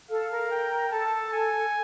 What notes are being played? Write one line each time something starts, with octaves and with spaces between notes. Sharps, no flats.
A4 F5
A#4
G5
A4 A5
G#5